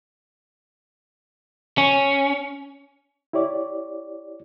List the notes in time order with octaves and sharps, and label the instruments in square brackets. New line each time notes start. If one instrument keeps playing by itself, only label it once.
[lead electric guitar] C#4
[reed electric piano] E4 G4 C#5 D5